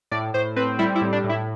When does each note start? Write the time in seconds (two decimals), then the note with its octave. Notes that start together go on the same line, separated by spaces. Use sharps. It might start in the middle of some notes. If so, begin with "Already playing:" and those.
0.11 A2 D5
0.34 A2 C5
0.56 C4 B4
0.79 G3 E4
0.95 E4
1.01 A2
1.12 D4
1.24 A2
1.29 E4